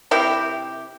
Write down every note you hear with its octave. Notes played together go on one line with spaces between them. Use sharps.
C3 E4 G4